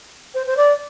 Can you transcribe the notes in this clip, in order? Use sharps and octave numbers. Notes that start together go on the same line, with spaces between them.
C5
C5
D5